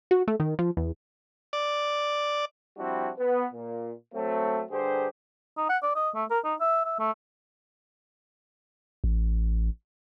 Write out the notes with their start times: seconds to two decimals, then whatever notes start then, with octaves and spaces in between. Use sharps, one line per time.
0.11 F#4
0.28 A3
0.40 D#3
0.59 F3
0.77 E2
1.53 D5
2.77 F3 G3 C4 D4 E4 F#4
3.18 B3
3.53 A#2
4.14 F#3 A3 C4
4.71 G2 D3 G4 G#4 C5
5.57 D#4
5.69 F#5
5.83 D5
5.96 D#5
6.15 A3
6.31 A#4
6.45 D#4
6.60 E5
6.85 E5
6.99 A3
9.04 A1